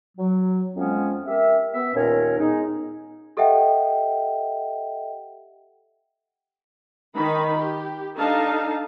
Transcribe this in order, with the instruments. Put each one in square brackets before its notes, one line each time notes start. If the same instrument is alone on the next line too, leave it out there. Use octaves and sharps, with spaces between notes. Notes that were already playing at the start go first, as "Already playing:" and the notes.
[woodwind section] F#3
F2 G#3 B3 C#4
G4 A#4 E5
B3 E5
D#2 A#2 C#4 A#4 C#5
G#3 B3 D#4
[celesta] G4 A4 D#5 E5 F#5 G5
[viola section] D#3 D#4 B5
G4
D4 D#4 A4 F5 A5 A#5